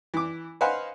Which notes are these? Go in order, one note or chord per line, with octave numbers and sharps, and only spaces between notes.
E3 D6
B4 C5 D#5 F5 F#5 G#5